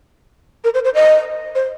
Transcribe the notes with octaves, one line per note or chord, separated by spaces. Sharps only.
A#4
C5
C5
D#5
C5